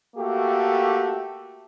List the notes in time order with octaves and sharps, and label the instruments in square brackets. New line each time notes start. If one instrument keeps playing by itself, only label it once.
[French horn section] A3 A#3 F#4 G4 A4